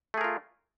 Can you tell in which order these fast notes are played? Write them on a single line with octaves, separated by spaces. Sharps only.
A3 G#4 A#4 F4